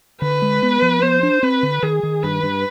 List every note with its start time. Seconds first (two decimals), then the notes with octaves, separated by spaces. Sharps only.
0.22 D3 B4
0.42 G#3
0.62 B3
0.82 F3
1.02 B3 C5
1.23 D4
1.43 C4 B4
1.63 D3
1.83 D#3 G#4
2.03 D#3
2.23 G2 B4
2.43 G2